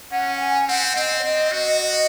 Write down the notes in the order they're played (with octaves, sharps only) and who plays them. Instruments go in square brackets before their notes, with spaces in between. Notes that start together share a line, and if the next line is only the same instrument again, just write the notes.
[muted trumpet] C#4 [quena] F#5
[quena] G#5
[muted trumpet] C4 [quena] F#5
[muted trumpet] C4 [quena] D#5
[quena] C#5
[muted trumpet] C4 [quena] D#5
[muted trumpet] F#4 [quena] D#5
[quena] D#5